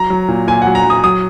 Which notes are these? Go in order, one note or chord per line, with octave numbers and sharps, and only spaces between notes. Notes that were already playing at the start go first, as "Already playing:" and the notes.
Already playing: F#3 A#5
F#3
A#2
A#2 G#5
F#5
F#3
A#5
F#3
D#6
F#3 D#6